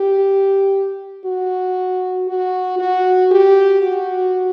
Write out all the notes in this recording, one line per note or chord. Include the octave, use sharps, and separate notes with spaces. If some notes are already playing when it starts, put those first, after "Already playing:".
Already playing: G4
F#4
F#4
F#4
G4
F#4